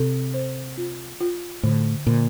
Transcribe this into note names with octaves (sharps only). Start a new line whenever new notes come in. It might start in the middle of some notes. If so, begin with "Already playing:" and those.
Already playing: C3 A4
C5
F4
F4
A2 D3
A#2 D3